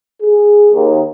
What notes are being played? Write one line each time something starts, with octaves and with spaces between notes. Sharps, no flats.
G#4
D#2